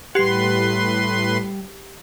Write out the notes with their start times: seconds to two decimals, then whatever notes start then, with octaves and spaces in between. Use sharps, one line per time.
0.15 A2 G3 G4 B4 F#5 C6 C7